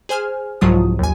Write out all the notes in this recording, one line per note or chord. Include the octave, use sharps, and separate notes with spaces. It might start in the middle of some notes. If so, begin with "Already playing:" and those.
G#4 C5 G#5 F6
C2 G#2 F3 F#3 F4 D#6
D#2 G#5